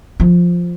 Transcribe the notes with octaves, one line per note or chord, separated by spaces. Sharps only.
F3